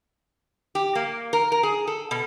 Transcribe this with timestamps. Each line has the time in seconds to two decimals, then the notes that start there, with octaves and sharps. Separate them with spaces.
0.75 G4
0.95 A#3
1.33 A#4
1.52 A#4
1.63 G#4
1.87 A4
2.11 B2